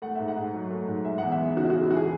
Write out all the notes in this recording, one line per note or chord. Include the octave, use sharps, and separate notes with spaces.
A3 F#5
G#2 E5
F#5
G#2
F#3
A3
G#2
G#3 E5
E2 F#5
E5
B3
C#3 F#4
E4
G#3 F#4
E4
E2 F#4
G#4